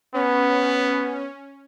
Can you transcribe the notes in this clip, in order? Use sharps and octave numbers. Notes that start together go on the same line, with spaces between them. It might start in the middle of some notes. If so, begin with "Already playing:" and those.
B3 C#4